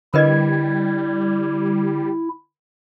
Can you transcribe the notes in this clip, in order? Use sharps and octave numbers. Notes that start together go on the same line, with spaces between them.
D3 G3 E4 A#4 B4 D#5 G#6